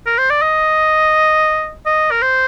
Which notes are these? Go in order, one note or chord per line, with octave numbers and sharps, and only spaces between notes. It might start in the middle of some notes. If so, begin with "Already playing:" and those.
A#4
C5
D5
D#5
D#5
A#4
C5